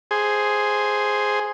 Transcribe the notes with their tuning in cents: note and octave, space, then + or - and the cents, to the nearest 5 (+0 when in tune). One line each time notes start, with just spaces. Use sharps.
G#4 +0 C5 +0